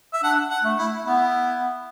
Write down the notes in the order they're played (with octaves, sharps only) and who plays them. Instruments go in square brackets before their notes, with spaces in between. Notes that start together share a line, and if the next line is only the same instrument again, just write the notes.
[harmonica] E5
[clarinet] D4 [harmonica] F#5
[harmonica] F#5
[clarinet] A3
[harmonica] E4
[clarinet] B3 [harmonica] E4